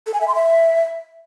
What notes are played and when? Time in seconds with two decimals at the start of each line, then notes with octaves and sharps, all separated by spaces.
0.07 A4
0.14 G#5
0.21 E5
0.28 C6
0.35 E5